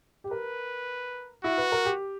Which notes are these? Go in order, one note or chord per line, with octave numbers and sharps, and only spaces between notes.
G4
A#4 B4
E4 F#4
B4
A#4
G4